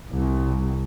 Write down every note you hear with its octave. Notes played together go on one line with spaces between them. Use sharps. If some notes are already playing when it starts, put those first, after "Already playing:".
C2